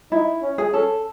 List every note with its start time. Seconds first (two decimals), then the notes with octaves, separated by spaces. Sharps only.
0.12 D#4 E4
0.43 C#4
0.58 G#4
0.73 C#4 A4